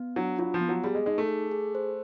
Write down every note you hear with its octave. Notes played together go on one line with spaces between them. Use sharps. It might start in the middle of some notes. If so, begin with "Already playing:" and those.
Already playing: B3
F#3 D4
F#3 F4
F3
B3
F#3
G3 G#4
G#3
G#3 D#4
A3
G#4
G#4
C5